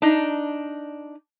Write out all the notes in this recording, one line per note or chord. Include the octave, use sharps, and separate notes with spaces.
D4 D#4